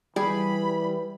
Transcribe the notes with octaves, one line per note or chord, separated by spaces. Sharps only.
E3 G3 G#4 B5